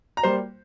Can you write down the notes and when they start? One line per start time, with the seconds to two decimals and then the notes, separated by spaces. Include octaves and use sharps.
0.17 A#5
0.23 G3 A#3 C5 C6